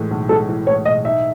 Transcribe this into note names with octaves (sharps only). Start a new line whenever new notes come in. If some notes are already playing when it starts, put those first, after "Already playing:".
Already playing: A2 E3 G#3
B1
G#3 A4
E3
A2 C#5
B1 D#5
D#4 E5